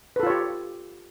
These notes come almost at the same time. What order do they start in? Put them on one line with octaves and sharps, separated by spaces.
B4 A4 F4 C#5 G4